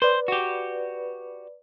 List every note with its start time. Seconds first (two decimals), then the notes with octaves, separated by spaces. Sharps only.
0.02 B4 C5 D5
0.28 F#4 G4